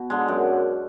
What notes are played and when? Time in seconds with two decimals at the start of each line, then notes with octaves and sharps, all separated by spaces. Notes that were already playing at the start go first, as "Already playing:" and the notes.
Already playing: B2
0.10 D3 G#3
0.28 F#2